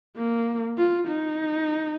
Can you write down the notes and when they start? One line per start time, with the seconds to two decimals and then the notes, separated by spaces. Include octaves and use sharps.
0.17 A#3
0.78 F4
1.08 D#4